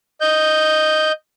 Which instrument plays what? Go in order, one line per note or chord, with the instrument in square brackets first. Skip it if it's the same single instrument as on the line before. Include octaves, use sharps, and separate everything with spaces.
[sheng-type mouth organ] D#5 G6